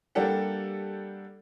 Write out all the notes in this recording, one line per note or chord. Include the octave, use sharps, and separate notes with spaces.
G3 A#3 D4 G4 A4 F#5